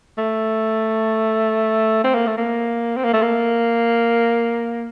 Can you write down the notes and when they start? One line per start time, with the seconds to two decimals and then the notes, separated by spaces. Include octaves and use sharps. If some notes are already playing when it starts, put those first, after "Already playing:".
0.18 A3
2.04 C4
2.15 A#3
2.27 A3
2.37 A#3
2.97 C4
3.04 A#3
3.13 A3
3.22 A#3